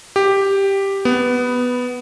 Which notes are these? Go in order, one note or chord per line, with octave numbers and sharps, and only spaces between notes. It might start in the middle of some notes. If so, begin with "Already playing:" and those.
G4
B3